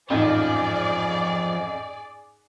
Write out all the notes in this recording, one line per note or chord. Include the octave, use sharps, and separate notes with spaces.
A1 F2 G#2 F3 C#4 D#4 G#4 D5